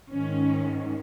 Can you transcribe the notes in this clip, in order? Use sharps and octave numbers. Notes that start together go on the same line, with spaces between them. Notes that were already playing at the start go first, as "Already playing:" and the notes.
G#2 D#3 C#4